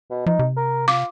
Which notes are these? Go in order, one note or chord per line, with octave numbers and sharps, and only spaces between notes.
B2
F3 D#4
C3
A#4
F4 D6